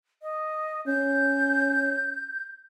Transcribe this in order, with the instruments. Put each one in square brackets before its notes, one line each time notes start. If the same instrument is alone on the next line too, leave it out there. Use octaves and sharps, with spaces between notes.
[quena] D#5
[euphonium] C#4 [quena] G6